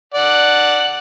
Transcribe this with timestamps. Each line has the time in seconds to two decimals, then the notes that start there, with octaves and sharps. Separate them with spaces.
0.14 D5 F#5